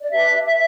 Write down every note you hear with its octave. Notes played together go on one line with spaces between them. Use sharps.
D5
D4 G4 B4 E5
E5